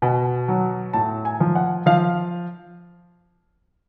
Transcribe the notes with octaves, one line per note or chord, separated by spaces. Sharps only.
B2
F#3
A2 A5
G#5
F3
F#5
F3 F5